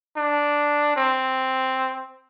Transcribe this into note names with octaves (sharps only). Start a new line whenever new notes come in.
D4
C4